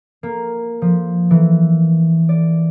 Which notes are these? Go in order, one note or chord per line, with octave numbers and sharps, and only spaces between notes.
A#3
F3
E3
D5